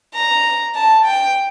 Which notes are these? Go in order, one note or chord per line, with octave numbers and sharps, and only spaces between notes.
A#5
A5
G5